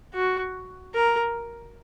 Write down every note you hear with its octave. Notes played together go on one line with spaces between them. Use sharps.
F#4
A#4